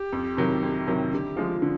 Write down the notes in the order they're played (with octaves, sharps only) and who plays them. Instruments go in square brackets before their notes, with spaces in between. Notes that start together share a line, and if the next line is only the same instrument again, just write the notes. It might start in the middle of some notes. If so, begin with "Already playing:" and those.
Already playing: [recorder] G4
[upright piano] F2
C3 D#3 F#3
F2
C3 D#3 F#3
[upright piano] D3 [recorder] G4
[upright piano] F3 G#3
D3